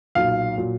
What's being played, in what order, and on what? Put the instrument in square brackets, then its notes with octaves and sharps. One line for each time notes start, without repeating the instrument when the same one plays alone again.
[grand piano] B1 A#2 F#3 F5
A#2 F#3